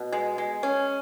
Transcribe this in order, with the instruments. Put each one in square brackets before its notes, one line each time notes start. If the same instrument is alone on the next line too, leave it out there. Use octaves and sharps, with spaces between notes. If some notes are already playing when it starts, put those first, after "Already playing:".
Already playing: [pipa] B2
G#3
G#3
C#4